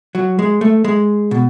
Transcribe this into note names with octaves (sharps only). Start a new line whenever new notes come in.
F#3
G#3
A3
G#3
B2